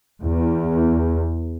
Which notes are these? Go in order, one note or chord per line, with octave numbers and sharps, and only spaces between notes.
E2